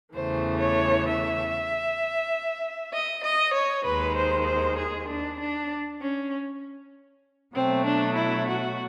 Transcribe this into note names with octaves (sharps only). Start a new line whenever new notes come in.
E2 C#3 E3 A3 C5
C#5
E5
D#5
D#5
C#5
D#2 D#3 G#3 B4
C5
C5
G#4
D4
D4
C#4
B2 F#3 A3 C4
D4
E4
F#4